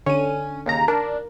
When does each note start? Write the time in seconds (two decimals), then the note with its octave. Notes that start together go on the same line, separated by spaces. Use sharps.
0.06 D3 C#4 D#7
0.66 D#2 C#3 A#5
0.88 D4 A#4